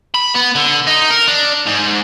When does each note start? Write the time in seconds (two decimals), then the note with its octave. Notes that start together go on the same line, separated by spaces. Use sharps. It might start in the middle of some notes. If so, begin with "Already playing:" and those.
0.15 B5
0.35 B3
0.55 D3
0.87 D#4
1.11 A#4
1.28 D4
1.66 G#2